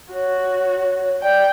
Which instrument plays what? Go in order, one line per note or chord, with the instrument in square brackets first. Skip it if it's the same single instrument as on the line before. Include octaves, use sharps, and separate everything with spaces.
[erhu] F#4 [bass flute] C#5
[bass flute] D5 [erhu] G5